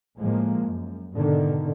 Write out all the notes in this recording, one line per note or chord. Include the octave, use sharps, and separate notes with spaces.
A2 F3 G#3 A#3
F#2
G#2 B2 D3 D#3